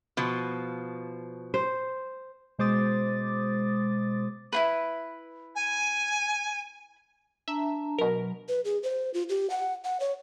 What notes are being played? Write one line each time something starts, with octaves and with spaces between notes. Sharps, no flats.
B2 F3
C5
B2 G#3 C5 D6 D#6 A6
E4 F4 B4
G#5
D4 E5 A5 A#5
B2 F#3 A#4
B4
G#4
C5
F4
G4
F#5
F#5
C#5